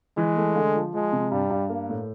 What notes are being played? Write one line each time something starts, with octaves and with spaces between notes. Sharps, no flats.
E3 G#3
A3
D3
F3
F3 G#3
C3
G2 G3
G2
A#3
A2